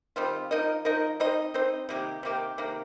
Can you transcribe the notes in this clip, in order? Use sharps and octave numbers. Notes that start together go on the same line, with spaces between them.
D#3 G3 C4 F4
F3 D#4 A#4 D#5
F3 D#4 A#4 D#5
C4 D#4 C5 D#5
C4 D#4 C5 D#5
C3 D#3 A#3 G4
C3 D#3 A#3 G4
C3 D#3 A#3